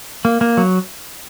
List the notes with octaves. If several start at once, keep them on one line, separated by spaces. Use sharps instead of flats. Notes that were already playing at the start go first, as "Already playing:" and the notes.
A#3
A#3
F#3